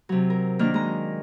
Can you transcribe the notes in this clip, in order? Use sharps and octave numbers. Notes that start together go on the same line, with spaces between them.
C3 F#3
A#4
D#3 A#3 D4 F6
G#3 A#5